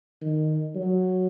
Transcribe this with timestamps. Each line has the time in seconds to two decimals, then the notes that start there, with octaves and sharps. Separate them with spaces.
0.21 D#3
0.75 F#3